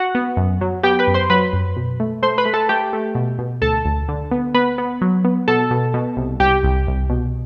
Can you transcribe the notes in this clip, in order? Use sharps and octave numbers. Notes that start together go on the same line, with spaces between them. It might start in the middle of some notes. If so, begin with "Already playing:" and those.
Already playing: F#4 F#5
B3
F#2
F#3
B3 G4 G5
B4 B5
F#2
C5 C6
F#3 B4 B5
F#2
B2
A3
A3 C5 C6
B4 B5
A3
A4 A5
A3 G4 G5
A3
B2
B2
D2 A4 A5
D2
D3
B3
B3 B4 B5
B3
F#3
B3
B2 A4 A5
B2
B2
C2
C2 G4 G5
C2
C2
B2